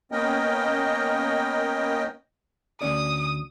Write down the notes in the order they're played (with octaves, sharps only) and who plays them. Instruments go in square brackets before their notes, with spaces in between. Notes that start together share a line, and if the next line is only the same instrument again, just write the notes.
[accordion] A#3 B3 C#4 A#4 D#5 G5
[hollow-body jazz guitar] D2 C#4 D5 [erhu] D#6